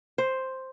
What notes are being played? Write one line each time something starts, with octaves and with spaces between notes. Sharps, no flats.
C5